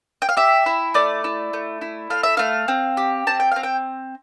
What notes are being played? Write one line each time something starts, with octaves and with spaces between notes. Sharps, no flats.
G5
F5
G4 E5
E4
A3 D5
E4
A3
E4
A3 F5
E5
A3 F5
C4
G4
C4 A5
G5
C4 F5
G5